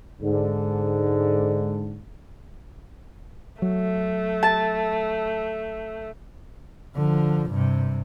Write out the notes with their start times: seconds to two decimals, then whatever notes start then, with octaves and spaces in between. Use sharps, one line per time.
0.21 G#2 D3
3.62 F#3 A3
4.43 A5
6.95 D3 F3
7.50 G2 C3